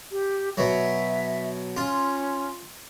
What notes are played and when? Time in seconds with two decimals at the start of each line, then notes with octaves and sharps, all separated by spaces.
0.12 G4
0.57 B2 F#3 E5
1.77 C#4 F4